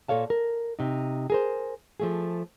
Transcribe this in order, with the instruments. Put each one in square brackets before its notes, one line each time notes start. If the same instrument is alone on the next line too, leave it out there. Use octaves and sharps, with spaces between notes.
[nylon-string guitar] A#2 A4 C#5 F5 A5
A#4
C3 D#4
G#4 A#4 C5
F3 A3 G#4